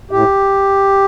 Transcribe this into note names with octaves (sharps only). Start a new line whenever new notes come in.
A2 G4